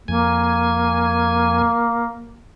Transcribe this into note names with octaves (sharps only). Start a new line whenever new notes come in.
F2 A#3 G#5